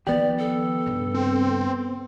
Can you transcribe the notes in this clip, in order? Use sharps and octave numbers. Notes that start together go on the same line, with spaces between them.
D#3 F3 B3 G4 D5
A4
G2 C#3
C4